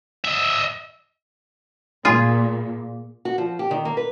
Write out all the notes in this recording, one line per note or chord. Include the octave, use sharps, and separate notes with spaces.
D#5 E5
A#2 F4 G#4
F#4
F3
G4
D#3
A#3
B4